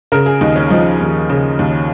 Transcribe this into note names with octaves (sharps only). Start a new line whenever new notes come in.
C#3 A#4
G#4
D#2 D#4
C#4
F3 D#4
D#2
C#3
D#2